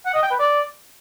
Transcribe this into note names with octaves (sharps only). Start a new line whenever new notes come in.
F#5
D#5
G5
B4
D5